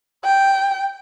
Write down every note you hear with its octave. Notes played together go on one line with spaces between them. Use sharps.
G5